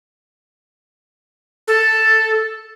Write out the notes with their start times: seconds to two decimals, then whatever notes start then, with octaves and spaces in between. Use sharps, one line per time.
1.68 A4